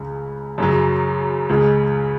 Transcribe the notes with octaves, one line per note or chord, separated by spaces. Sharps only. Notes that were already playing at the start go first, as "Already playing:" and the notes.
Already playing: C#2 C#3 G#3
F#2 C#3 F#3
C#2 C#3 G#3